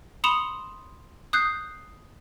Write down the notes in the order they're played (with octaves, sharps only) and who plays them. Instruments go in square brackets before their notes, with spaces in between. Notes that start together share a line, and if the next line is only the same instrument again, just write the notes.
[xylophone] B5 C6 D#6 C#7 E7 F7
D#6 F#6 G6 C7